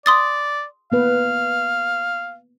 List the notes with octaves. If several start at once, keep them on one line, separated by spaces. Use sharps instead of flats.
D5 C6 D#6 A6
A#3 B3 B4 F5